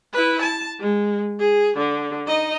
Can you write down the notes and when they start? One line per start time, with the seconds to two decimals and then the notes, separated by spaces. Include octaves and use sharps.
0.13 E4 B4
0.42 A5
0.80 G#3
1.39 G#4
1.78 D3
2.27 D#4 D#5